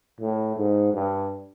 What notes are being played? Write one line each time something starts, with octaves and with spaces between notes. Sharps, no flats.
A2
G#2
G2